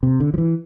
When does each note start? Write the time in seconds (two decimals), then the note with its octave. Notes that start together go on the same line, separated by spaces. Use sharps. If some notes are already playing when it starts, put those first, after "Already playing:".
0.03 C3
0.20 D3
0.34 F3
0.38 E3